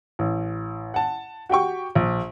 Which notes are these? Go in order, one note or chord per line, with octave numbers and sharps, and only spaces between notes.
A1
F#5 A5
F#4 G4 G5 C#6
A#1